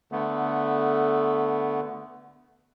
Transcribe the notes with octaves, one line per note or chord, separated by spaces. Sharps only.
D3 A3 B3